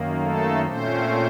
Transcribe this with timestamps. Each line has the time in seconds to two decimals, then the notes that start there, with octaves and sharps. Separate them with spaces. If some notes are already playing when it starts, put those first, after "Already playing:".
Already playing: F#2 D#3 A#3
0.21 A3 A4
0.66 A#2 A3 C4 C#4 C5